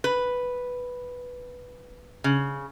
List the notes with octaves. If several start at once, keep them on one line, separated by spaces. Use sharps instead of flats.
B4
C#3